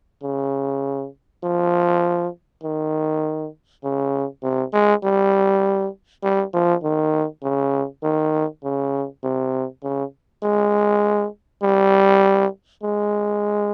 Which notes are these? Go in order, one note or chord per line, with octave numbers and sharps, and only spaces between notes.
C#3
F3
D#3
C#3
C3
G#3
G3
G3
F3
D#3
C#3
D#3
C#3
C3
C#3
G#3
G3
G#3